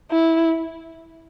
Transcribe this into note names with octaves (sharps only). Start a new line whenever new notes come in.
E4